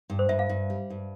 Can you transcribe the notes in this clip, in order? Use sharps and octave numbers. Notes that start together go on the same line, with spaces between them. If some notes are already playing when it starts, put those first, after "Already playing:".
G2
C5
G2 E5
F5
G2
G3
G2